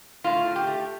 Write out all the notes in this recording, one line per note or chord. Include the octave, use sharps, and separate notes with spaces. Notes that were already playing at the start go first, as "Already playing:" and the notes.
A2 F4
A2
G4
A3